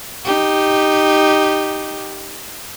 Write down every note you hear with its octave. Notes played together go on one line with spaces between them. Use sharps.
D#4 G4